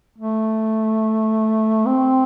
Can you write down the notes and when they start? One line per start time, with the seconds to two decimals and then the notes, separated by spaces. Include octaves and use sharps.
0.18 A3
1.86 C4